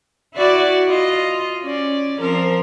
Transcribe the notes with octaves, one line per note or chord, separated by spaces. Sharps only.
E4 F#4 D5
F4 D#5
C#4 D5
F3 C4 A#4